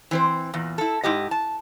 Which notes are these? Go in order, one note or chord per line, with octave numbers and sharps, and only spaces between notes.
E3 C4 C5
E2 A#2
E4 A4
G#2 E4 G4 D#5
A5